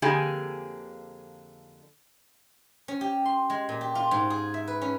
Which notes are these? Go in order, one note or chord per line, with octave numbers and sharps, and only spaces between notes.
F2 D3 A#3 G4 G#4 G#5
C#4
G4
C6
G#3
A#2
G4
F4
G#2
G#4
E5
B4
C#4